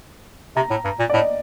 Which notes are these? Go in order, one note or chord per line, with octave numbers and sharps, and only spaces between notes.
C3 A#5
A2
G2
A#2
D5
A2 D#5